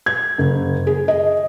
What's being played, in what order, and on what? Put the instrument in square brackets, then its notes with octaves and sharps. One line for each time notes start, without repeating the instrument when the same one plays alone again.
[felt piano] G#6
F#1
G#4
D#5